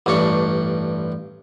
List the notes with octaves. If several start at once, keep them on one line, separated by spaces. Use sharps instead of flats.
A1 G2 D4 C#6